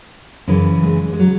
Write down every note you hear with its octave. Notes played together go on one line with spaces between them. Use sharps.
F#2 C#3 E3
G#3
G#3
F#3